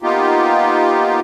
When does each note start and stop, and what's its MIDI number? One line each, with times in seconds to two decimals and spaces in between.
0.02 1.20 58
0.02 1.20 59
0.02 1.20 63
0.02 1.20 65
0.02 1.20 67